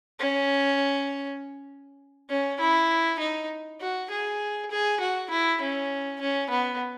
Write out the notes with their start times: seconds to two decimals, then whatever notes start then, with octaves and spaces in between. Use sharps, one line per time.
0.20 C#4
2.30 C#4
2.60 E4
3.19 D#4
3.80 F#4
4.10 G#4
4.71 G#4
5.00 F#4
5.30 E4
5.61 C#4
6.21 C#4
6.50 B3